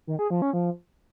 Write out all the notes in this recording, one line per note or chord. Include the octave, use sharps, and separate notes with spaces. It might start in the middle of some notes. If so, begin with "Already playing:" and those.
D#3
G#4
F3
C#4
F3